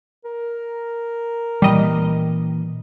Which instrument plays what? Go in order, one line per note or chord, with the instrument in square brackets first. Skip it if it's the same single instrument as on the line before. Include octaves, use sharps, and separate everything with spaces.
[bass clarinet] A#4
[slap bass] A#2 E3 [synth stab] G3 D#5